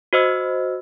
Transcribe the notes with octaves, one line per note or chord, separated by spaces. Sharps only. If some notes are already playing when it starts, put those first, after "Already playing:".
F#4 C5 D#5 E6